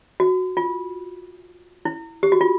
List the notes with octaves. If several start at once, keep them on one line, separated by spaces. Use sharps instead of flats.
F#4
F4
E4
G4
F#4
F4